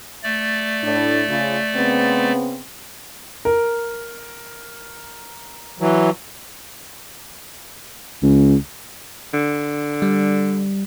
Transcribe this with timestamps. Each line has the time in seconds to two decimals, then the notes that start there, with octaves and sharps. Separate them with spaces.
0.24 A3 D5
0.84 A2 D4
1.29 C#3 F4
1.76 C#3 B3 C4
3.45 A#4
5.80 E3 F#3
8.23 C#2
9.34 D3
10.02 G3